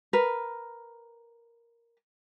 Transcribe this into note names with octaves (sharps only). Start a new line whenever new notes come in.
A#4 B4